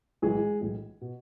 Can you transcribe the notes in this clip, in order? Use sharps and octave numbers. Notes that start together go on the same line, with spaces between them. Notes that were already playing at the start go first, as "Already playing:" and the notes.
B1 A2 E3 G#3 G#4
B1 A2 E3
B2